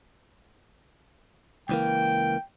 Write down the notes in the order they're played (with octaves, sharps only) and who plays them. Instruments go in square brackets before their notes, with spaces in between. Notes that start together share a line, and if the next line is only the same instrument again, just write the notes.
[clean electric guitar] C#2 E3 A#3 [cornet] G5